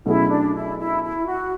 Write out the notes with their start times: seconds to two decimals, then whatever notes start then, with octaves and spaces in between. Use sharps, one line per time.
0.05 B2 F#3 A3 C#4 E4 G#4
0.29 D4
0.54 E4
0.78 E4
1.03 E4
1.27 F#4